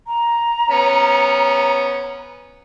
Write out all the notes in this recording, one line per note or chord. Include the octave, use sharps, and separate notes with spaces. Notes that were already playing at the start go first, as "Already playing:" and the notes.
A#5
B3 C#4